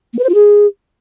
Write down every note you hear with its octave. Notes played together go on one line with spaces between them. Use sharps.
A#3
B4
C5
F4
G#4